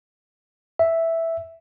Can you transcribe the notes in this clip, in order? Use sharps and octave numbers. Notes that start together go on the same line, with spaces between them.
E5